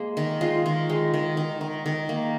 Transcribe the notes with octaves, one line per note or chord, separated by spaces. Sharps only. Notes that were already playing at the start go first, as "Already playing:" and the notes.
Already playing: G#3 A#3
D#3
G#3 F4
D#3
G#3
D#3
D#3
D#3
D#3
A#3